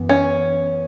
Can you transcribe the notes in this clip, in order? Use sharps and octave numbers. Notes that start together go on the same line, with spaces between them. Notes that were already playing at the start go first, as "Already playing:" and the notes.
Already playing: F#2 E3 B3
C#4